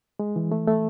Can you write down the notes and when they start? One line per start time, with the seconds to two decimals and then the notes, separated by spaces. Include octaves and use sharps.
0.19 G#3
0.36 E3
0.52 A3
0.68 A3